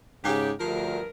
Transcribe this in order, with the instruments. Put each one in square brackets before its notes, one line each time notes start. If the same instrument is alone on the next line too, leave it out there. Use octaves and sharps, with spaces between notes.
[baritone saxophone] G#2 [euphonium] C#3 [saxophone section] G4
[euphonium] D2 [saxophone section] G2 A#4 [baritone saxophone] F3